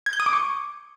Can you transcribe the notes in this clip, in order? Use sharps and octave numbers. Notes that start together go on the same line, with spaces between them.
G#6
G6
D#6
D6
C#6